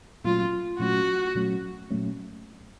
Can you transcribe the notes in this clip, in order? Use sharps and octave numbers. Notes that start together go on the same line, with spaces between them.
A#2 F#3 A3 C#4 F4
A#2 F#3 A3 C#4 F#4
A#2 F#3 A3 C#4
A#2 F#3 A3 C#4